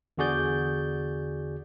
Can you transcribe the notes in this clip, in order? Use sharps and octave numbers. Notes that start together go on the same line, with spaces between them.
E2 D3 F#4 G#4 D5 G6